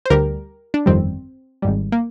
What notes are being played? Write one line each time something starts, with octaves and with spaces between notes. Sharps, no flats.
C5
D2 D3 G3 G4 A#4
D4
G1 F2 D#3 G3 C4
G#1 G#2 G3
A#3